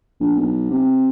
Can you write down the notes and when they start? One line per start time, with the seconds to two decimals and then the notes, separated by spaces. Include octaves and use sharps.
0.20 A#1
0.36 B1
0.71 C3